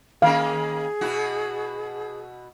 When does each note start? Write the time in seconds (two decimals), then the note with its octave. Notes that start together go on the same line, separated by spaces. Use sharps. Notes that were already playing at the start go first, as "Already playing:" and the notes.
0.22 D#3 A#3 C#4 G#4 F5
1.01 B2 E4 F#4